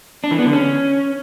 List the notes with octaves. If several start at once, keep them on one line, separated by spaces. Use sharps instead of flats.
D4
E3
B3
D3
C#4